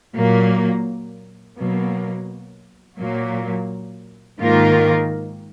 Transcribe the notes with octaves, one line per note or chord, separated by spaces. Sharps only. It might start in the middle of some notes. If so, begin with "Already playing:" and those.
A#2 F#3 A#3
B2 F#3 A#3
A#2 F#3 A#3
G#2 D#3 A#3 F4 A#4